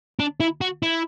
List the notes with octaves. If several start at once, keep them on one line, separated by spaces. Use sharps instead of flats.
D4
E4
F#4
E4